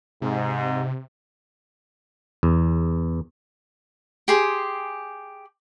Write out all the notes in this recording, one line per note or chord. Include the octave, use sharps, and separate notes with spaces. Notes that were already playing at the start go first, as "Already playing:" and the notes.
G#2 C3
E2
G4 G#4 C6